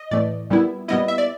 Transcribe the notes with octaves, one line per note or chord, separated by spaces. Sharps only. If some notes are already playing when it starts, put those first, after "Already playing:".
Already playing: D#5
A2 E3 A3 D5
A#2 G3 B3 E4
A#2 G3 B3 E4 D#5
E5
D5